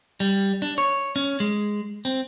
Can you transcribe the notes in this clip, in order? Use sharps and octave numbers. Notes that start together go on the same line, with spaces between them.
G3
D4
C#5
C#4
G#3
C4